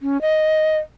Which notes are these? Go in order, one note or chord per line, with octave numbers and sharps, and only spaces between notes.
C#4
D#5